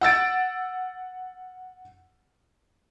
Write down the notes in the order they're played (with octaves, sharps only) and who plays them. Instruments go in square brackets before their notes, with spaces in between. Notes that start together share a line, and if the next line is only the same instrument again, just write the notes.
[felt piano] F#5 E6 A6 D7